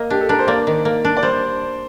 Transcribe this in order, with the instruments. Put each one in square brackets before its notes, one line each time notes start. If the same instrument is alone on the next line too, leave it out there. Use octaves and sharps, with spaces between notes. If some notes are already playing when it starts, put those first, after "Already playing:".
Already playing: [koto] A#3 [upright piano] D#5
[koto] D4 [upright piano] G4
[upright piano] A4
[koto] D4 [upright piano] A#4
[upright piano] C5
[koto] A#3 [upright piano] D5
[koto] D#3
A#3
D4
[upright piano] D5
[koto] G3 [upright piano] C5